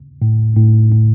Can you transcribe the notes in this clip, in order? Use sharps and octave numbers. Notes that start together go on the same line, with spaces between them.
A2
A2
A2